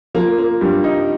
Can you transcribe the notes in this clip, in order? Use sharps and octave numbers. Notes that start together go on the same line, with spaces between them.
F3 A#3
A#3
G2 G3
D#4